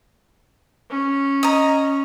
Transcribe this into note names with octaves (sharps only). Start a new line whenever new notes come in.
C#4
D#5 A#5